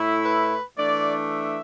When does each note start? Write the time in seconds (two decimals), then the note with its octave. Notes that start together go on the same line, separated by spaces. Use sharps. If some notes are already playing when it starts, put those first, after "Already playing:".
Already playing: A2 A3 E4
0.25 B4
0.77 E3 A3 D4 D5
1.29 E5